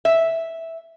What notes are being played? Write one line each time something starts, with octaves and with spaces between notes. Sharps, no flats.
E5